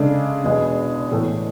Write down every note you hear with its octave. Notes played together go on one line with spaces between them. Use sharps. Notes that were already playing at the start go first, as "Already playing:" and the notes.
Already playing: C#3 G#3 D4 A4
E2 B2 G#3
A2 E3 A3